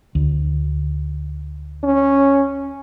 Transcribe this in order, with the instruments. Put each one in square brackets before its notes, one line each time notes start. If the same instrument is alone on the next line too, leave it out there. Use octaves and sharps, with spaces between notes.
[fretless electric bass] D2
[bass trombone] C#4